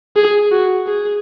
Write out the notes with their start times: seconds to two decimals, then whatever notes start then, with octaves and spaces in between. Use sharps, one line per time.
0.16 G#4
0.51 F#4
0.87 G#4